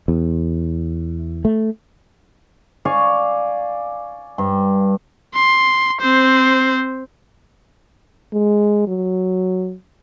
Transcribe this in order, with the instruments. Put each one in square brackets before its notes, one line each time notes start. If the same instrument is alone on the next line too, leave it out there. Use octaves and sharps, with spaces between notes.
[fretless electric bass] E2
A3
[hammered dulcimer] D5 F5 G#5 C#6
G2
[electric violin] C6
C4 C5
[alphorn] G#3
F#3